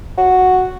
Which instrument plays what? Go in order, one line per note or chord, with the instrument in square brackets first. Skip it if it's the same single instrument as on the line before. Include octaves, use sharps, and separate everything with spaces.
[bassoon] F#4